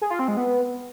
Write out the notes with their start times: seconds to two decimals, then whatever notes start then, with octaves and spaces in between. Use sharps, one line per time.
0.01 G#4
0.10 F4
0.19 C4
0.28 G#3
0.37 B3